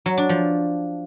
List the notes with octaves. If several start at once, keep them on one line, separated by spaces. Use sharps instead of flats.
F#3
D4
F3